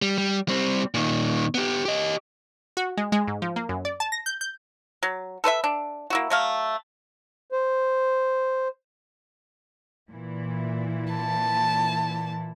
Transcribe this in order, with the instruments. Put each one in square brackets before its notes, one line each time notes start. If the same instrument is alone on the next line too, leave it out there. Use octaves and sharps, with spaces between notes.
[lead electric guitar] G3
G3
G3 C4
A#2 D#3
B3 G4
G4 D#5
[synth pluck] F#4
G#3
G#3
G#2
F3
A#3
F#2
D5
A5
A#6
G6
G6
[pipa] F#3
A4 B4 C5 E5
D4
A#3 E4 F#4
F#3 A3 F5
[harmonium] C5
[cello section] A#2 E3 E4
[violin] A5